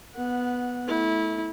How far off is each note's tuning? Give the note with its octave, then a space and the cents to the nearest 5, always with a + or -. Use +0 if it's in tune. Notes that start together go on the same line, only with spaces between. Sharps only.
B3 +0 F#5 -15
A3 -10 E4 -25